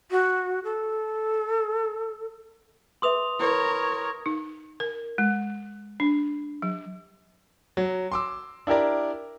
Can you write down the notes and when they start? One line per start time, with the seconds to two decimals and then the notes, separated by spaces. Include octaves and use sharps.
0.11 F#4
0.64 A4
3.02 G#4 B4 E5 C6 D#6 F7
3.40 E4 A#4 B4 C#5 B5
4.26 D#4
4.80 A#4
5.18 G#3
6.00 D4
6.62 F#3
7.77 F#3
8.12 C6 D6 E6
8.67 D4 E4 G4 A#4 D5